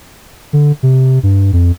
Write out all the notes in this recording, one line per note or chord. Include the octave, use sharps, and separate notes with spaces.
D3
C3
G2
F2